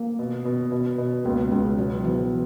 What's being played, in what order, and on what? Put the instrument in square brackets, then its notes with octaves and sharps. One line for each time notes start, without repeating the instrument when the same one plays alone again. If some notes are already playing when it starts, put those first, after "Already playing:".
Already playing: [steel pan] A#3
[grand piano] B2
B2
B2
B2
[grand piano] C#2 [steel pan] A#3
[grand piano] C#2 [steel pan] G#3
[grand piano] B2 [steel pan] F#3
[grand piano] B2 [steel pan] E3